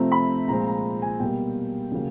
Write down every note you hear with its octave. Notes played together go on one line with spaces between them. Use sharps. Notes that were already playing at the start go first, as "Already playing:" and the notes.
Already playing: C3 F3 A3 C4 A#5
B5
A#2 F3 G#3 C4 A#5
A#5
G#5
B2 G3 A#3 G5
C#3 F#3 A#3